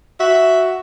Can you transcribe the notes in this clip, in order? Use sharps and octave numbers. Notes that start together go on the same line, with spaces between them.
F#4 E5